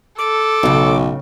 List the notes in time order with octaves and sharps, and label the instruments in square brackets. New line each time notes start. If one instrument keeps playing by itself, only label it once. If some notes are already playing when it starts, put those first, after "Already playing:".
[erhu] A4 [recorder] D6
[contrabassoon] B1 [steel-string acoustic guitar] A2 C#3